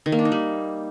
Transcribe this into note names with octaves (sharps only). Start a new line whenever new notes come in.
D#3
A#3
D4
D#4
G3